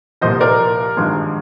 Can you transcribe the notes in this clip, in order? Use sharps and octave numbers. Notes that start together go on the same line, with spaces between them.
C2 A#2 F3 C5 D#5
A#4 D5
G#1 G2 F3 G#3